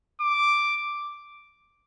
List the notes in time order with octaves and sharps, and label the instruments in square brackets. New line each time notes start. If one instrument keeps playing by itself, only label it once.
[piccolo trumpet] D6